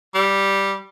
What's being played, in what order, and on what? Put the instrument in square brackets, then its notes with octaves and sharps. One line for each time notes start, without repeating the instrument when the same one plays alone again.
[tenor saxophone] G3